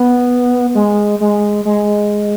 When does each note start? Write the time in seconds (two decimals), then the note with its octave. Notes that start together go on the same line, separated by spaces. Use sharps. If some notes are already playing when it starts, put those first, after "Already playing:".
Already playing: B3
0.75 G#3
1.20 G#3
1.65 G#3